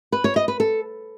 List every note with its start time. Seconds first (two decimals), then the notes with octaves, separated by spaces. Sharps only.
0.12 B4
0.24 C#5
0.36 D#5
0.48 B4
0.60 A4